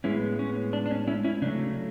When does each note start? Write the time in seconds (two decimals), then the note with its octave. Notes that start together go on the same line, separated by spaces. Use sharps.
0.04 A2 G#3 B3 C#4 E4
0.39 C#4
0.73 D4
0.86 D4
0.91 C#4
1.07 C#4 E4
1.24 C#4 E4
1.42 C#3 F#3 A3 D4